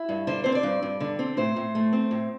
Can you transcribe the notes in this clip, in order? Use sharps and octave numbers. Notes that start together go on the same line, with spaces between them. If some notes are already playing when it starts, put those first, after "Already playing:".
Already playing: E4
G2
D3 C5
C4 C5
D5
G2
G2
D3
C4
A2 C5
A2
A3
C4
A2